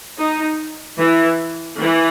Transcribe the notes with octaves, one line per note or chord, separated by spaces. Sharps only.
D#4
E3
E3